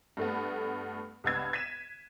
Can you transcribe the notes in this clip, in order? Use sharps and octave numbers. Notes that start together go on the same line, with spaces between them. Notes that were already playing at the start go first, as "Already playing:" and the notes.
G2 A3 B3
C#2 G2 B3 E6 G#6
G#6 B6 D#7 E7